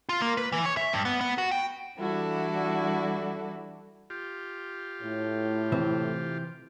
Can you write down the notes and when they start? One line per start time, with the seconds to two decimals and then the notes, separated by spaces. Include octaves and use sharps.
0.09 F4
0.22 A#3
0.37 B4
0.52 E3
0.66 C#5
0.77 E5
0.93 G2
1.05 B3
1.21 B3
1.38 F#4
1.51 G5
1.98 E3 G3 D4 E4 F#4 A4
4.10 F4 G4
5.02 A2
5.72 C3 E3 C4